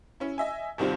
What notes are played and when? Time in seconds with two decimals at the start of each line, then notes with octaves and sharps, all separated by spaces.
0.20 C#4 E4
0.38 D#5 E5 G#5
0.78 G1 C2 D#3 G3 C4 F4